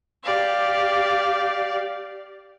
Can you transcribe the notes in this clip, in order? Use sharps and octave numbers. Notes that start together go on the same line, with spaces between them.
G4 D5 F5